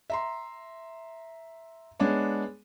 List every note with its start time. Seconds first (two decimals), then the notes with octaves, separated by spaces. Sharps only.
0.10 E5 A#5 C6
2.00 G#3 B3 D4 C#5